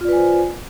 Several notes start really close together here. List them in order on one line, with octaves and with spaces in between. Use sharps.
F4 D5 B4 G#5 C5